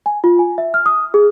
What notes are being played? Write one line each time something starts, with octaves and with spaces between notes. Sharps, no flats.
G#5
F4
G#5
E5
F6
D#6
G#4